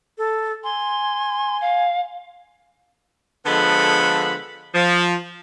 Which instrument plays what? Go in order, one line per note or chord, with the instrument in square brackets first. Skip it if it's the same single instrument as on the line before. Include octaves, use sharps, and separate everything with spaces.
[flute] A4
[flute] G#5 [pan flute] C6
[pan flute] F5
[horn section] D3 F3 G#3 B3 A4 B5
F3